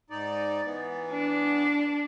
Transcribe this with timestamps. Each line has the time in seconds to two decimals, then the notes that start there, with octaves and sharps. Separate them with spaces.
0.10 G#2 D#4 D5
0.65 E3 B3
1.11 D4